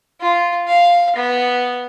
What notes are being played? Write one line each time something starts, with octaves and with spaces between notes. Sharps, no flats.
F4
F5
B3